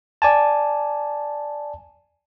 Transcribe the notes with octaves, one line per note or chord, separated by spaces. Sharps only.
D5 G#5 A5